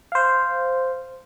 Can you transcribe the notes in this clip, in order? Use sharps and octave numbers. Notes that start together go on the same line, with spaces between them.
C5 F5